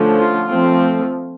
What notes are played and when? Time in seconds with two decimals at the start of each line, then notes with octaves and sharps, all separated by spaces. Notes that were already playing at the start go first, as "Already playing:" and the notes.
Already playing: D3 F3 A3 C#4
0.17 F4
0.50 F3 A3 C4